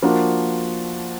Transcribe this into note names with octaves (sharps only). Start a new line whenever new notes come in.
F3 A#3 D4 F#4